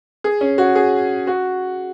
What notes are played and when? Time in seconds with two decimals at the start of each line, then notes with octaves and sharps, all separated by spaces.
0.24 G#4
0.41 C#4
0.58 F#4
0.75 G#4
1.27 F#4